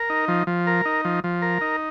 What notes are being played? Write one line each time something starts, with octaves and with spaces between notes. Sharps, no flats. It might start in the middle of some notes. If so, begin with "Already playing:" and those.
Already playing: A#4
D#4
F3
F3
A#4
D#4
F3
F3
A#4
D#4